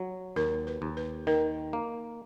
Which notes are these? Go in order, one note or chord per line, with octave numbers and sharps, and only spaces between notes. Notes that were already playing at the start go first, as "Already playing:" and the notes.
Already playing: F#3
D#2 A#4
B4
D#2
B4
D#3 A#4
A#3